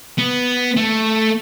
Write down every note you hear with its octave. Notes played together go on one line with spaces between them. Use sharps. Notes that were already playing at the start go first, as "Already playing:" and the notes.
B3
A3